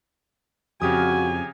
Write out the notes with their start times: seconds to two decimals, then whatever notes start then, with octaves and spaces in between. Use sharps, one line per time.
0.82 F2 C#3 F#4 G4 G#5 D#6